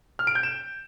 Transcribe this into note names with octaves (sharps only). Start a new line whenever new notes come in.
F6
D7
G6
E7